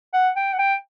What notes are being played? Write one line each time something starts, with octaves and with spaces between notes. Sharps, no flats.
F#5
G5
F#5
G5